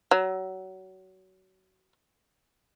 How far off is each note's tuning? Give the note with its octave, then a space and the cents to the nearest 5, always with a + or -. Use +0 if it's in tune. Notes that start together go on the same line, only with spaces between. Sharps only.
F#3 +25